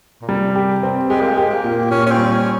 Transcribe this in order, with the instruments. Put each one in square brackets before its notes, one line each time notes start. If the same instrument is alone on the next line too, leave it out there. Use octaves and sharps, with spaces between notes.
[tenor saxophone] A#2
[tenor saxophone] C3 [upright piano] G3
[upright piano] G4
C4
[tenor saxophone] G#3 [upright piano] G4
[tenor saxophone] A#3
G#3
[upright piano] G4
[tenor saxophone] A#3
[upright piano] A#2
[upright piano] A#2 [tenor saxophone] C#4
[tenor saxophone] C#4
C4
[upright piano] G3
[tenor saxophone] C#4